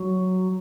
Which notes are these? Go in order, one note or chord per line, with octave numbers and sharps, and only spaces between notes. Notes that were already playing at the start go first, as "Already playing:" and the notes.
Already playing: F#3